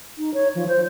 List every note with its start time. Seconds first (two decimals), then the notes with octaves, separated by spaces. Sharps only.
0.18 D#4
0.34 C#5
0.55 F3
0.68 C5